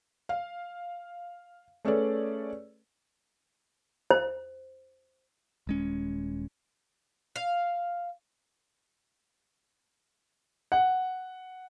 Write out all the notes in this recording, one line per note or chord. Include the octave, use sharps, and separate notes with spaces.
F5
A3 C#4 G#4 A4 B4 D5
C5
D#1 G#3 C#4
F5
F#5